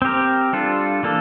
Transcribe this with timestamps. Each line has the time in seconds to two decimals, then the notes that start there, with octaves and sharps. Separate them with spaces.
0.02 C4 G4 A#4
0.53 G3 D4 F4 A4
1.03 E3 A#3 D4 A4